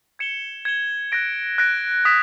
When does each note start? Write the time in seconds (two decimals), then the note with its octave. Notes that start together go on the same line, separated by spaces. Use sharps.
0.19 G#6 C#7 E7 G7
0.65 G#6 C#7 E7 G7
1.12 F#6 A#6 D7
1.58 F#6 A#6 D7
2.05 D#6 G#6 B6 E7